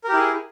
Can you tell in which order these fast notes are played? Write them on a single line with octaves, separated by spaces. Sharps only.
A#4 G4 E4 G#4